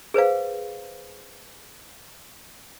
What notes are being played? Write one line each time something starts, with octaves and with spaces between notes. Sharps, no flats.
G#4 B4 C5 F5